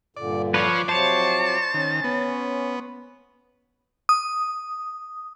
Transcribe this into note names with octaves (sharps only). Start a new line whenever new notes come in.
G2 A#2 D3 D5
F3 F4 B4 C#5 D5
C3 F3 F#3 C5 C#5 A5
D#3 C#4
B3
D#6